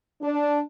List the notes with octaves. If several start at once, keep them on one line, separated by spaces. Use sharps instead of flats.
D4